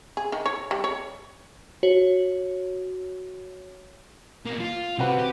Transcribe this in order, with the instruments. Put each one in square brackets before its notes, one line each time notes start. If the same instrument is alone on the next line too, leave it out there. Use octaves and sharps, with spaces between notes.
[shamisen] G#4
D#3
C#5
G3
C#5
[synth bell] F#4 C#5
[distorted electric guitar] B2 A#3
F4
[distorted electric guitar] C3 [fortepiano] C4 F#4 B4
[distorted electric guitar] G4